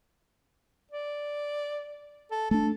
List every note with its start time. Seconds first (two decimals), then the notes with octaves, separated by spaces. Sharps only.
0.92 D5
2.31 A4
2.51 A3 D4 A4